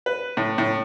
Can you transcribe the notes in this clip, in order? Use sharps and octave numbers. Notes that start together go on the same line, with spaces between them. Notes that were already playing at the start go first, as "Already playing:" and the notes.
B4
A2
A2